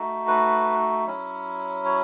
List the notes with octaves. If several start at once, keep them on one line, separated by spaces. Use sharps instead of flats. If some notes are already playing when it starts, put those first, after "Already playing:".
Already playing: A3 D#4 F#4
B4
F#3 C#4 E4
C#5